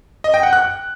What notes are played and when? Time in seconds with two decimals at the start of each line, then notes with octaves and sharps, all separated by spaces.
0.24 D#5
0.34 G5
0.43 F#5
0.53 F#6